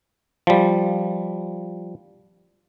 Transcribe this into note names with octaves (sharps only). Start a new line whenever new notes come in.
F3 G3